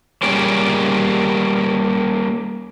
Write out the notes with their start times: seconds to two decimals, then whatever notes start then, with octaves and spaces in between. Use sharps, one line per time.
0.23 G3 A#3 C#4 G#4 D5